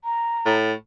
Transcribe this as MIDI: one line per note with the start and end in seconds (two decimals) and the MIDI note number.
0.04 0.54 82
0.46 0.73 45